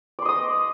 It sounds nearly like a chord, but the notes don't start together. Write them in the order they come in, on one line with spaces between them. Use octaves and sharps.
D5 C6 D#5 D#6